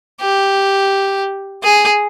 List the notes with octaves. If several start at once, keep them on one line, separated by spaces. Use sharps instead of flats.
G4
G#4